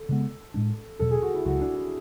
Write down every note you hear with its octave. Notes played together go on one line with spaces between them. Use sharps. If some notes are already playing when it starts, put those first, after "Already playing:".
Already playing: A4
C#3 G#3 B3
A2 G#3 D4
E2 B2 F#3 A4
G#4
F#4
E4
C#2 C#3 F#3 F#4
D4
E4